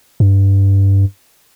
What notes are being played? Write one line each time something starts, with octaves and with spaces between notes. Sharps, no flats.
G2